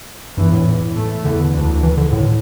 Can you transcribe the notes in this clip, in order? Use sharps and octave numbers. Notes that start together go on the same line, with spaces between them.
E2 G2 E3
A2
A2 A3
E2 D3 E3
D2 D3
E3
D3
A2